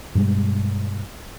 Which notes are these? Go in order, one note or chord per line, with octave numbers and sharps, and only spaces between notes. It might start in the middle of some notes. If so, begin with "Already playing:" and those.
G2 B2 G3 G#3